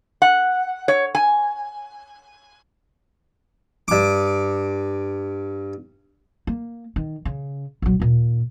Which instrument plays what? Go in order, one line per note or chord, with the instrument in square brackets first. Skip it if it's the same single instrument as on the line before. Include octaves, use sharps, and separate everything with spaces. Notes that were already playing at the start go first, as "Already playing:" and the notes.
[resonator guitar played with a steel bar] F#5
C#5
G#5
[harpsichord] G2 D6
[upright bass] A#3
D#3
C#3
A#1 F#3
D#2 A#2